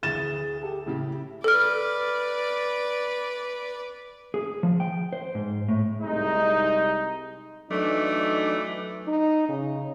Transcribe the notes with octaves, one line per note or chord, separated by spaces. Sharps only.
D2 E3 G#4 A6 E7
G4 A4
A2 C#3 E4 G4
A4 B4 D5 F6
G#4
F3
G5
C5
G#2
A2
C2 G#3 D#4
E3 F#3 A3 D4 D#4
D#4
C#3